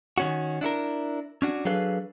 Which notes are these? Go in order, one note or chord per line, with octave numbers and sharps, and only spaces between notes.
D#3 C#4 F#4
D4 E4 A4 A#4
C#4 D4 F#4
F#3 D4 G#4 A4 B4 F5